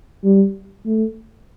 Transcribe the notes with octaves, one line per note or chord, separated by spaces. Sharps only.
G3
A3